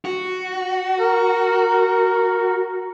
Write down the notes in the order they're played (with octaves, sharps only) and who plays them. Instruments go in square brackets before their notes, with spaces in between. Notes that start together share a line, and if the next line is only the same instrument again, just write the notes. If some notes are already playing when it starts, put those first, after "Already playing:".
[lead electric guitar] F#4
[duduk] A#4